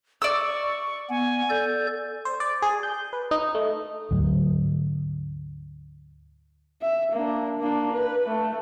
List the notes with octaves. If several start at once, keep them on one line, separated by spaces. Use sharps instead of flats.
D5 C#6 E6
B3 G#5
A4 D5 G6
C5
D5
G#4
G6
B4
D#4
A3
D2 G#2 F#3
E5
A#3 D4
A#3 D4
B4
A3